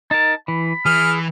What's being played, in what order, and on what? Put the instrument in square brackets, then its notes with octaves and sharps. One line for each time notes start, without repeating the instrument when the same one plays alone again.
[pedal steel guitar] D#4 A#4 [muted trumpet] A5
[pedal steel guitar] E3 [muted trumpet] B5
[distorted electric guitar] E3 [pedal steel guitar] G#4 [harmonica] F6